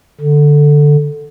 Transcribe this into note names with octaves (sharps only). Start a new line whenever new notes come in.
D3